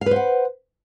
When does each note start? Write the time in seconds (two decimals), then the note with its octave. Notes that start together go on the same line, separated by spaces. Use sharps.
0.01 F5
0.06 B4
0.11 C5
0.16 F#5